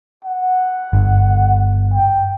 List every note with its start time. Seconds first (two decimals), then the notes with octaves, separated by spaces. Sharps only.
0.25 F#5
0.93 G1
1.94 G5